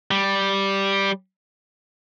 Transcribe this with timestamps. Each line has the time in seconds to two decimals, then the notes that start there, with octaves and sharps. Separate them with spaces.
0.11 G3